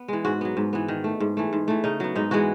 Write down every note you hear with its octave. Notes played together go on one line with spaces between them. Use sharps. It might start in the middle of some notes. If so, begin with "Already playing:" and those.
Already playing: B3
E3 G#3
G#2 F#4
F#3 B3
G#2
E3 B3
D#3
A3
G#2
E3 A3
G#2
E3 A3
C#3 D#4
F#3 B3
G#2 D#4
E3 G#3 B3 F#4